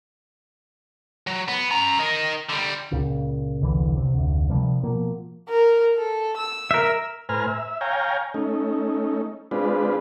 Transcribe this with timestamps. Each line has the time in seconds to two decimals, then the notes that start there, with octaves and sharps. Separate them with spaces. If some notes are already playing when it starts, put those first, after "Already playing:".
1.27 F#3
1.48 B3
1.71 C#4 A#5
1.99 A#4 D#5
2.49 D3 G3
2.92 C#2 A#2 C#3
3.61 E1 C2 D3 E3
3.97 C3
4.14 F1 D2
4.50 C3 D#3 F3 G3
4.84 B2 F3 A#3
5.50 A#4
5.97 A4
6.37 E6
6.71 A#4 E5
7.29 A2 B4 C5 G#5 A#5 F6
7.47 E5
7.81 C#5 F5 G5 G#5 A#5
8.34 A3 C#4 D#4
9.51 G#3 C4 D4 F4 B4